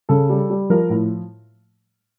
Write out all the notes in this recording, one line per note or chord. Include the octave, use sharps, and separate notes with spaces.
C#3 A4
G3
G3
F3 A#4
A2